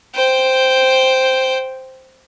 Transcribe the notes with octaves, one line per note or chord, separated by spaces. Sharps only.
C5 G5